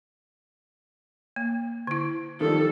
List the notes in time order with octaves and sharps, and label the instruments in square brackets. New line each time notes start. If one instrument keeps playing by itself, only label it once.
[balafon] A#3
D3 E4
[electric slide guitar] D#3 F3 G3 [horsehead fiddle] A4